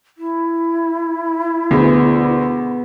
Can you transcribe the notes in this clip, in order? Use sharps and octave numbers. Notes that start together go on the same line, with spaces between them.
E4
D2 B3 G#4